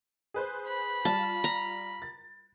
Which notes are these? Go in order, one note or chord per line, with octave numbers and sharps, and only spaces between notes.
G#4 B4 C5
B5
G3 F4 A5
A#5
A6